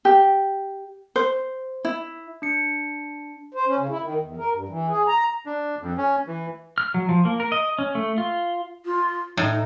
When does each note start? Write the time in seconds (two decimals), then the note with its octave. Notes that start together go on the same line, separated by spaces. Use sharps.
0.05 G4
1.16 C5
1.85 E4
2.42 D4 C#7
3.54 C5
3.67 C#4
3.78 C#3
3.89 E4
4.01 D#3
4.21 E2
4.37 A#4
4.52 G2
4.69 E3
4.89 G#4
5.08 A#5
5.46 D4
5.82 F2
5.98 C#4
6.27 E3
6.78 F6
6.94 F#3
7.09 F3
7.25 A#3
7.40 A#4
7.52 D#5
7.79 C#4
7.95 A3
8.18 F4
8.85 F4
9.37 A2 D#4
9.52 D#4